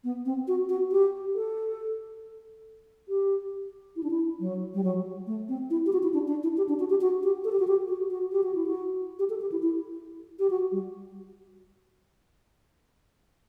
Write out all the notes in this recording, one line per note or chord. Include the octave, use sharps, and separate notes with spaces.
B3
C4
F#4
F#4
G4
A4
G4
E4
D4
E4
F#3
G3
F#3
A3
C4
E4
G4
F#4
E4
D4
D4
E4
G4
D4
F#4
G4
F#4
G4
A4
G4
F#4
G4
F#4
F#4
G4
F#4
E4
F#4
G4
A4
G4
E4
E4
G4
F#4
G3